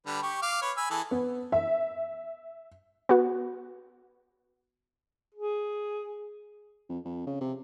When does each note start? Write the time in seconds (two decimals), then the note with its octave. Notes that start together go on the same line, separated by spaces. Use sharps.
0.06 D3 G3 B4
0.22 G4 C#6
0.42 F5 D6
0.62 B4 C#5
0.77 G#5 B5 E6
0.90 E3 G#4 A4
1.11 B3
1.52 E5
3.09 B3 F#4
5.35 G#4
6.89 F2
7.05 F2
7.27 C#3
7.41 C3